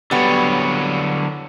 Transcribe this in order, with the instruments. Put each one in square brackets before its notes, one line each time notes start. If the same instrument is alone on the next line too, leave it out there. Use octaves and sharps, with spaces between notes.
[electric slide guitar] D3 F#3 C#5 [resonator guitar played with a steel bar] G3 B3